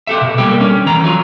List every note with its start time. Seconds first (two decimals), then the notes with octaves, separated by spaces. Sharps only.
0.07 G4 A4 E5
0.21 B2
0.38 G3 A#3 G4 A4
0.61 C#4
0.86 E3 A#5
1.04 F#3 F4